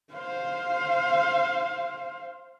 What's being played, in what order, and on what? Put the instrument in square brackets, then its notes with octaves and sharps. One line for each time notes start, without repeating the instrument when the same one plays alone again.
[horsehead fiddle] C5 F5